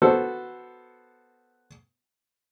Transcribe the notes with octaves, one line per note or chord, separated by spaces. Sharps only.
B3 F#4 A4 C5